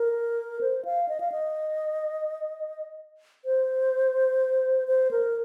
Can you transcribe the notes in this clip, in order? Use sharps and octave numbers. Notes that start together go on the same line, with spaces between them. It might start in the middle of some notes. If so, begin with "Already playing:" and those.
Already playing: A#4
C5
F5
D#5
F5
D#5
C5
C5
A#4